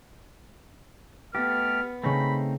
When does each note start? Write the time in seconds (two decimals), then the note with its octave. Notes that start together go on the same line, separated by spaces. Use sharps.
1.35 A3 B3 G4 F6 A6 A#6
2.03 C#3 A3 C4 D#4 B5 A#6